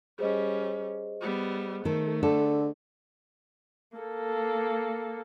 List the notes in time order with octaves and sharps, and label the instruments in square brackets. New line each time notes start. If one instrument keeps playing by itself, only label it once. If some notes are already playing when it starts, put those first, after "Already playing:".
[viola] G3 C#4 [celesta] G#4 C5 D#5
[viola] G3 B3
[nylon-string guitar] D#3 A4 [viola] A3
[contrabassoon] D3 [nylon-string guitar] A4
[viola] A#3 A4